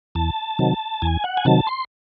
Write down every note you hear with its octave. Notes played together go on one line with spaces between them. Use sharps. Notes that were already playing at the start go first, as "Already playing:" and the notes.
E2 A5
C3 D#3 F#3
E2 G#5
F#5
G#5
C3 D#3 F#3 A5
C6